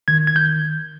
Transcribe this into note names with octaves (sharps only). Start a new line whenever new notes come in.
D#3 G#6
G#6
G6